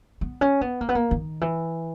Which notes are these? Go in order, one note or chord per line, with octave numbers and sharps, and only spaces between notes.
B3
C#4
B3
A#3
B3
A#3
D#3
E3